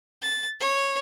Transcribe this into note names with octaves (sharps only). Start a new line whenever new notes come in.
A6
C#5